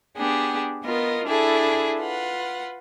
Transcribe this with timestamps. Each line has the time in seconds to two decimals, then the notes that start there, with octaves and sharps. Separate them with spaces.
0.17 B3 D4 G4 G#4
0.84 B3 F4 A#4 D#5
1.27 D4 E4 G#4 A4
2.00 F4 B4 F#5